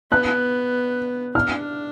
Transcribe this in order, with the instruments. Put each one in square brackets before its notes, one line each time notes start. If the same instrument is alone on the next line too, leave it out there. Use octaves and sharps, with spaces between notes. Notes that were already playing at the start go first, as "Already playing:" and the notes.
[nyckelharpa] B3 [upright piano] F#6
[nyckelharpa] D4 [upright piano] F6